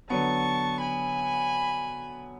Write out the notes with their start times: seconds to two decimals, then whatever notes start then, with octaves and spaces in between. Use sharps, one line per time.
0.10 D3 F#3 B3 A5 C#6
0.80 G#5 B5